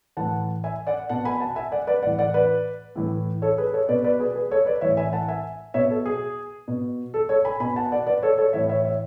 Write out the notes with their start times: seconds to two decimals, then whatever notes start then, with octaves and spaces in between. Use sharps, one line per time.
0.17 A2 E3 F#5 A5
0.64 E5 G#5
0.87 D5 F#5
1.09 B2 F#5 A5
1.25 G#5 B5
1.40 F#5 A5
1.56 E5 G#5
1.72 D5 F#5
1.87 B4 D5
2.02 A2 E3 D5 F#5
2.19 D5 F#5
2.34 B4 D5
2.96 A2 E3
3.42 A4 C#5
3.58 G#4 B4
3.73 A4 C#5
3.89 B2 B4 D5
4.04 B4 D5
4.20 G#4 B4
4.35 G#4 B4
4.51 A4 C#5
4.66 B4 D5
4.81 A2 E3 C#5 E5
4.97 E5 G#5
5.13 F#5 A5
5.28 E5 G#5
5.74 B2 C#5 E5
5.90 A4
6.06 G#4
6.68 B2
7.14 A4
7.29 A4 C#5
7.45 G#5 B5
7.60 B2 G#5 B5
7.76 F#5 A5
7.92 D5 F#5
8.07 B4 D5
8.22 A4 C#5
8.38 A4 C#5
8.53 A2 E3 C#5 E5
8.69 C#5 E5
8.85 C#5 E5